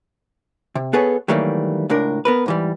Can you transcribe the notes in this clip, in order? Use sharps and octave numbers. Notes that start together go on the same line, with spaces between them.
C3
B3 G#4 A4 B4 C#5
D#3 E3 F#3 G3 A3 A#3
C#2 A2 D4 A#4
B3 A#4 B4
G#2 E3 G3